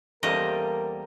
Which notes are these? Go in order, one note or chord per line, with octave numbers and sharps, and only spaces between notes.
E2 G3 A#3 C#4 A4 A#4 C5 D#5